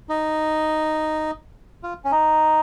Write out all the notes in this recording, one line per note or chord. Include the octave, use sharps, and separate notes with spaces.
D#4
F4
C#4
D#4